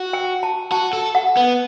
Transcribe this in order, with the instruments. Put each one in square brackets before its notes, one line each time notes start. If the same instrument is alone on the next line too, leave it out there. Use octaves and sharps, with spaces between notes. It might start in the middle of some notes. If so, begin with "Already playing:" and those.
Already playing: [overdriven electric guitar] F#4
[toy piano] G5
A5
[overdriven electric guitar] F#4 [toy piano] A5
[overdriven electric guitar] A4
[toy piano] F#5
[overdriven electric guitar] B3